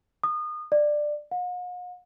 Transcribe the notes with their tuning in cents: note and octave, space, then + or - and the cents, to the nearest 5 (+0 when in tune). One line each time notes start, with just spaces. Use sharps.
D#6 -30
D5 +15
F#5 -45